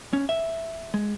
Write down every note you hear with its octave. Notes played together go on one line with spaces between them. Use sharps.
C#4
E5
G#3